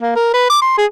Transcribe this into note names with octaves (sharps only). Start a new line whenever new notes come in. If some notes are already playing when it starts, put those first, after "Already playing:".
A#3
A#4
B4
D6
C6
G#4